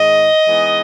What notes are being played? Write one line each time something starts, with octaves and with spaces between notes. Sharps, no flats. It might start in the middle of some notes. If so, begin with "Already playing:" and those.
Already playing: G#2 D#3 G#3 D#5
E3 G#3 B3 D#4